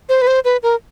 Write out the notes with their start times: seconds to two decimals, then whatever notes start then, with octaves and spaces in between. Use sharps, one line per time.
0.09 C5
0.22 B4
0.27 C5
0.45 B4
0.63 A#4